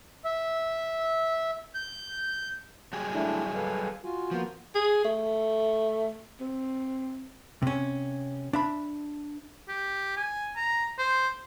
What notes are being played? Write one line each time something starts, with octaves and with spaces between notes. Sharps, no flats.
E5
G6
F#3 G3 G#4
A3 D4 E4
A4 B4 F5
F4 F#4 G#5
F3 A#3 B3 F#4
G#4
A3
C4
C3 C#4
D4 E5 B5
G4
G#5
A#5
C5